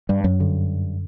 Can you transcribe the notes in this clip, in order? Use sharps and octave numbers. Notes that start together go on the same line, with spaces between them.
G2 G3
F#2 F#3
G2 D3